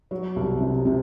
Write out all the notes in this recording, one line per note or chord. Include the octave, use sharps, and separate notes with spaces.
F#3
C2
C3
C3